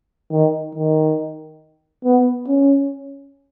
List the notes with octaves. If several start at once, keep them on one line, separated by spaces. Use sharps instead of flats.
D#3
D#3
B3
C#4